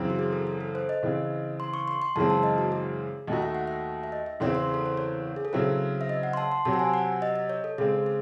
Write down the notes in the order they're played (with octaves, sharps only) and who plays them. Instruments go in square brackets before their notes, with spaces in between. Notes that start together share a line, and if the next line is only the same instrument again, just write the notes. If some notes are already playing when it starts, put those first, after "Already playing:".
Already playing: [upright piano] F#2 C#3 E3 C4
[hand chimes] F#4
G#4
A4
A4
A4
C5
D#5
[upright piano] C#3 E3 C4
[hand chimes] C6
C#6
C6
C6
[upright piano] F#2 C#3 E3 G#3 C4 [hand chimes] A5
[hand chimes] A5
D#5
F#4
G#4
[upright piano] D#2 D#3 A3 D#4 F#4 [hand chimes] D#5
[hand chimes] E5
F#5
E5
E5
D#5
E5
[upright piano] E2 C#3 E3 C4 [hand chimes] C6
[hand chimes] C6
A4
C5
C#5
G#4
A4
[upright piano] C#3 F#3 C4 E4 [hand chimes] C5
[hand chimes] E5
D#5
F#5
C6
A5
C6
[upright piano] C3 F#3 C4 [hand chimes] A5
[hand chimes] F#5
G#5
F#5
D#5
D#5
C#5
A4
[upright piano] C#3 G#3 C4 [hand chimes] G#4
[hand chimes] G#4